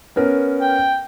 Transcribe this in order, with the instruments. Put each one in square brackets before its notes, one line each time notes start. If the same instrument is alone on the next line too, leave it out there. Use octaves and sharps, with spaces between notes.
[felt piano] B3 C#4 A#4
[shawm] G5